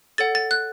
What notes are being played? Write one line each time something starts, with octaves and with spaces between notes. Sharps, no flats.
A4 C#5 F#5 A6
A6
F#6